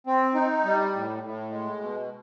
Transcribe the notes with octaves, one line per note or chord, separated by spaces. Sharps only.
C4
D#4
G3
A2
A2
G#3
B2